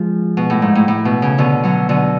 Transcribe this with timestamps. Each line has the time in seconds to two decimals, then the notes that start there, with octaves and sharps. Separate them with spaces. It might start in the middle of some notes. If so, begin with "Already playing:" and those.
Already playing: F3 G#3
0.37 B2
0.50 A2
0.62 G#2
0.75 A2
0.88 A2
1.05 B2
1.22 C#3
1.38 B2 D3
1.64 D3 F#3
1.89 B2 D3